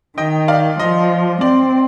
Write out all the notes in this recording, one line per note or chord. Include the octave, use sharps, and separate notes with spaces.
D#3 D#5 G5
D5 F5
F3 D#5
C4 D5